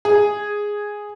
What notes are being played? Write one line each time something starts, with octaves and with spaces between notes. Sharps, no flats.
G#4